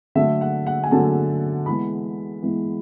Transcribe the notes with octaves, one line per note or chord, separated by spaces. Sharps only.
D3 F#3 A3 E5
F#5
F#5
G#5
D3 F#3 A3 A5
E3 G#3 B3 B5
E3 G#3 B3